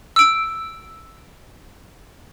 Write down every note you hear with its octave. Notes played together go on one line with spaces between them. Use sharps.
E6 D7